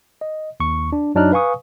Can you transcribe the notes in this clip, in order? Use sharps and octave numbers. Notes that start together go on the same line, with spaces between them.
D#5
D#2 C#6
D4
F#2 F#3 D4 D#4 F6 F#6
B4 F5 G#5 C#6 D#6